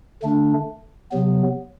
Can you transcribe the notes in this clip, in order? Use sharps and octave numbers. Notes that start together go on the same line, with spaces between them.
D3 A3 D4
C3 F#3 B3